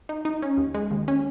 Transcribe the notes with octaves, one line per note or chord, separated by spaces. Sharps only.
D#4
D#4
C#4
D#2
G#3
D#2
C#4